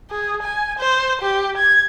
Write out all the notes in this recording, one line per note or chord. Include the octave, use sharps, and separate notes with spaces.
G#4
G#5
C5
G4
G#6